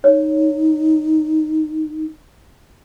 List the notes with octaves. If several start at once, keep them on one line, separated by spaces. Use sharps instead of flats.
D#4 C#5